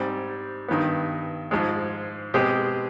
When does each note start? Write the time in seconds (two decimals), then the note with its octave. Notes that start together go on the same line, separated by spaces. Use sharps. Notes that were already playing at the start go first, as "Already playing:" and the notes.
Already playing: G#2 G3 C4
0.68 G2 D#3 B3
1.51 G#2 F3 G#3
2.34 B2 G#3 C4 G4